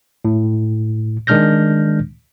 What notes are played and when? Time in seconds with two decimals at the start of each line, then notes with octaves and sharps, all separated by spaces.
0.25 A2
1.27 D#3 G#3 D4 F6 G6 A#6